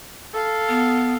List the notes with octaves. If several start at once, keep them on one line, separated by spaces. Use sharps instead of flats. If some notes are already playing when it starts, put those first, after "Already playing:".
A4 F5
B3